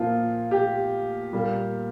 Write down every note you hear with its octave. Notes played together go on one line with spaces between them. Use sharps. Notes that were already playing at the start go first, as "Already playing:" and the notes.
Already playing: A#2 F3 A#3 F4
G4
A#2 G3 A#3